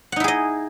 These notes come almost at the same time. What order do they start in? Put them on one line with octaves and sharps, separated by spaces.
F#5 D#4 E4 G#4 D#5